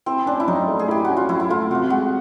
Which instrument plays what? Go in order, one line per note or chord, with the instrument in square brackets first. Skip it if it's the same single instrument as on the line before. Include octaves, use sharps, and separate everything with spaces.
[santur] C4 [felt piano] E4
[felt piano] C#4 [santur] D4
[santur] E4
[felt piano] F#3 [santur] D#4
[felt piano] A3
[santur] G#4
[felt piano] E4 [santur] G4
[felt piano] C#4 [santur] F#4
[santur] F4
[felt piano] F#3 [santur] E4
[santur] E4
[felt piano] A3 [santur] F4
[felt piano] C3 [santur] F#4
[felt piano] G#3 [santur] F#4